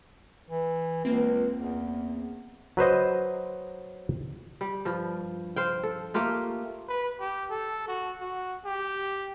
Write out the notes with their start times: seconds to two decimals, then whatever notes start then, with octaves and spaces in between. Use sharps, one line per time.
0.50 E3
1.05 C#2 A#3 C4
1.58 E2
2.77 F#3 B4 C5 D#5
4.61 G3
4.85 G2 F3
5.56 C5 F5 G5
5.83 A4
6.14 A3 A#3 F4 G4
6.89 B4
7.20 G4
7.51 A4
7.88 F#4
8.21 F#4
8.65 G4